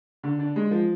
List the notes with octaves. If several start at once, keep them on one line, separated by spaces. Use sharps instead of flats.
D3
D4
G#3
F3